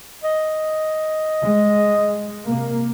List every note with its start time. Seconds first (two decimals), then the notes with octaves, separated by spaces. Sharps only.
0.24 D#5
1.42 G#3
2.47 C3 A#3